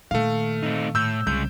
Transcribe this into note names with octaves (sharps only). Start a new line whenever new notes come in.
A#2 D#3 A3 F5
C4 D#4
A2 E6 G6
C2 C#3 G#3 G6